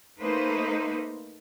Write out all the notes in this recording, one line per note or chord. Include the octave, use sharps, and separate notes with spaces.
A3 A#3 D#4 B4 C5